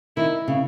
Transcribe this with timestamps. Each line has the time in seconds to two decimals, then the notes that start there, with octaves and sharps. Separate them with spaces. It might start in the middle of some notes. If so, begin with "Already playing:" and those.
0.17 D#3 E4
0.48 C#3